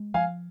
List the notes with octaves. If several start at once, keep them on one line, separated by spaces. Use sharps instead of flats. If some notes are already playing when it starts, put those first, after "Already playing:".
Already playing: G#3
F3 F5 G#5